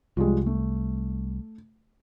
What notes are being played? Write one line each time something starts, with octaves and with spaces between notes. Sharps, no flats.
C2 F3 G3 G#3
A3